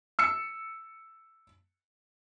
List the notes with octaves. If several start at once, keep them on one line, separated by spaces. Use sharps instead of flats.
E6 C#7